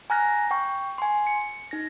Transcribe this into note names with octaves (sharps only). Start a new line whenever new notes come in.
G#5 A#5 F6 F#6 A#6
G5 C#6
G#5 C6
C#7
D#4 A#6